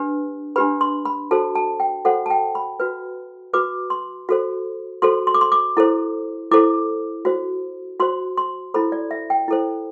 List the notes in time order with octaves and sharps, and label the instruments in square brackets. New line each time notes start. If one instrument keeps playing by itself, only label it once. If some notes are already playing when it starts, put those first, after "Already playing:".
Already playing: [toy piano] D4 G4 B4
D4 G4 B4 B5
C6
B5
F#4 A4 C5 A5
A5
G5
F#4 A4 C5 F#5
A5
G5
B5
F#4 B4
F#4 B4 D6
C6
F#4 A4 C5
F#4 A4 C5 C6
C6
D6
C6
D6
E4 A4 C5
E4 A4 C5 D6
F#4 C5
F#4 C5 C6
C6
E4 A4 C5 B5
D5
E5
G5
E4 A4 C5